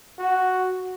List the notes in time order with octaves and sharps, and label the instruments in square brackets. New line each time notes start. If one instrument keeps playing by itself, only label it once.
[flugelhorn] F#4